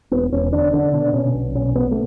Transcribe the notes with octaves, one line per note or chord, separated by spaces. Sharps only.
E1 B3
E1 C#4
D3 D4
D3 D4
B2 D4
B2 C#4
B1
B2 C#4
B2 B3
A3